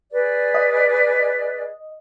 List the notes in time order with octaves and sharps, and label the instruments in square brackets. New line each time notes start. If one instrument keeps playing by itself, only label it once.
[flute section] G#4 B4 D5
[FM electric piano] D#5